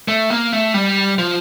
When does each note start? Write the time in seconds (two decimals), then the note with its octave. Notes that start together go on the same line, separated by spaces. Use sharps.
0.08 A3
0.30 A#3
0.52 A3
0.74 G3
1.18 F3